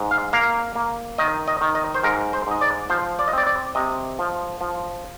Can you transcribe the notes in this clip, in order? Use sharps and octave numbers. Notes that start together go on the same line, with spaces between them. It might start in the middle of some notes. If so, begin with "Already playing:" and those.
Already playing: G#2
F5
A#3 F5
A#3
D#3 D#5
D#5
D#3
D#5
C5
G#2 A#4
C5
G#2 D#5
D5
F3 C5
D5
D#5
C4 D5
D5
C3 D#5
F3
F3